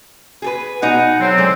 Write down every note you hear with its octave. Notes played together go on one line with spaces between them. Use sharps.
G#4 A4 B4
B2 D#4 G#4 F#5
F#3 C4
D3 G#3